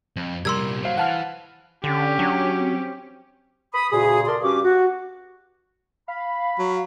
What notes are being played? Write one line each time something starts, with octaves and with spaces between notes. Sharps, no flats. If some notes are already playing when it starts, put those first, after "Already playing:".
F2
C2 A#2 G3 A#4 C6 E6 G#6
F#3 C5 F5
E3 F#5 A5 F6
D3 C#4 G4
F#3 D4
C4
B5 D#6
D2 A#2 C#3 F#4 G#4 D#6
A4 A#4 D5 C6
G2 C#4 F#4 G4 D6
F#4
F5 B5
F#3